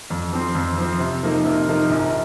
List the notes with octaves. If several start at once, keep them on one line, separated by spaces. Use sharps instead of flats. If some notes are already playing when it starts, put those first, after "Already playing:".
F2
F3 C4
F2
F3 C4
C3
F3 A#3 D#4 A#4
C3
F3 A#3 D#4 A#4
A#1